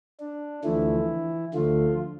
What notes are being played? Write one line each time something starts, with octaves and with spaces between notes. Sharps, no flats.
D4
D2 D3 E3 F3 A3 E4
D2 D3 F3 A3 F4